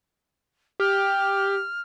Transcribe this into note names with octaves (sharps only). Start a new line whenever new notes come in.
G4 F6